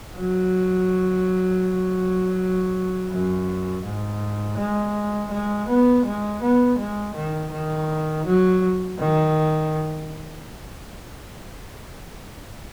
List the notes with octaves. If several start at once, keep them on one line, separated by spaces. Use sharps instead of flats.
F#3
F#2
G#2
G#3
G#3
B3
G#3
B3
G#3
D#3
D#3
F#3
D#3